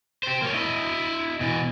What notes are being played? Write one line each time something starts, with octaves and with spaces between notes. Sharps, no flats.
G4 C5
A#3 C#5
E4 D#5
B2 E3